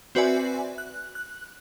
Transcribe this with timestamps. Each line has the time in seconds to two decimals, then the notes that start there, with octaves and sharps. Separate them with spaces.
0.15 C4 F#4 B4 D5 E5 G#5
0.78 F#6
1.15 F#6